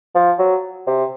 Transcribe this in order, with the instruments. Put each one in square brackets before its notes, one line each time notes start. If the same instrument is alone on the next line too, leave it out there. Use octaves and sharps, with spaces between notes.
[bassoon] F3
F#3
C3